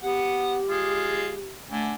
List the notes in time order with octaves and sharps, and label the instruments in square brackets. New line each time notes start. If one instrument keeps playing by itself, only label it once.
[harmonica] B3 F#5 [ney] G4
[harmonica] G#3 F4
[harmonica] D3 G#5 [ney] A3